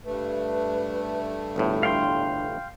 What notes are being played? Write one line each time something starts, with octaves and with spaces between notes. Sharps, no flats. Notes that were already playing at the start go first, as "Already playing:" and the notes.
G2 A3 B4
G1 E2 A2
D4 F5 G5 C6